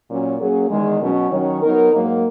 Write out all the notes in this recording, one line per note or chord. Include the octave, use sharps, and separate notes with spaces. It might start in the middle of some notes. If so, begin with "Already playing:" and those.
A#2 F#3 C#4
F#3 A#3 C#4 G#4
E2 D#3 G#3
B2 F#3 C#4 F#4
D#3 F#3 C#4
F#3 B3 D#4 A#4
G#2 F#3 A#3